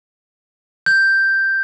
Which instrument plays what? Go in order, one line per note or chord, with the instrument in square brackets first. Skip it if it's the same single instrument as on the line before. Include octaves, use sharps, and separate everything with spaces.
[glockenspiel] G6